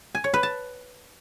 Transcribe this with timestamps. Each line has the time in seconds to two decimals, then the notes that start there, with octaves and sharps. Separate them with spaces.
0.15 G#5
0.24 C#5
0.34 B4
0.43 A5